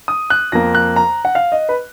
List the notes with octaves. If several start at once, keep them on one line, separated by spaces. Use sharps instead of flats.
D#6
F#6
F2 F3 A#3 A#6
F#6
A#5
F#5
F5
D#5
B4